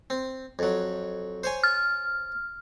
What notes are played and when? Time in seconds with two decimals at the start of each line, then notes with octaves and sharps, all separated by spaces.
0.10 C4
0.59 F2 F#3
1.44 C5 C#5 G#5
1.64 F6